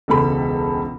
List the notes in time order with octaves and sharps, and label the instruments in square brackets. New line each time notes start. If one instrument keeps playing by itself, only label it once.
[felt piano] E1 C#2 A4 B5